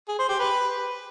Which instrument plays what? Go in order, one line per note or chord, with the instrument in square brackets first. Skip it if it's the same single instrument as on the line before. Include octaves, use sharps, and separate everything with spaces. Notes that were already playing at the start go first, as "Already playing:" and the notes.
[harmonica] G#4
C5
G4
B4